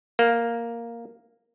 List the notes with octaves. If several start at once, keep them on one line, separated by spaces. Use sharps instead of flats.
A#3